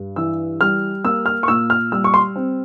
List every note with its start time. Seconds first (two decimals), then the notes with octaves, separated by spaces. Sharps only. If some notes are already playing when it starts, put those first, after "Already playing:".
Already playing: G2
0.16 E3 E6
0.61 G3 F6
1.04 A#3 E6
1.26 F6
1.43 C#6
1.48 A#2 E6
1.70 F6
1.92 G3 E6
2.04 C#6
2.14 C6
2.36 C4